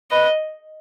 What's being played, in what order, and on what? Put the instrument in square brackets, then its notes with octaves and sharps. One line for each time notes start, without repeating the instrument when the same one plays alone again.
[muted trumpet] B4 [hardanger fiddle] D#5